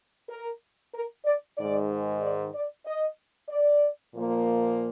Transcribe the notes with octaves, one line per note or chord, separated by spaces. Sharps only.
A#4
A#4
D5
G#2 D#3 G#3 D5
D5
D5
D#5
D5
A#2 F3 A#3